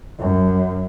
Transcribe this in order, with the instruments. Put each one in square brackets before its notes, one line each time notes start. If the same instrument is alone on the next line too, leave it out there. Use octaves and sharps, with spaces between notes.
[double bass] F#2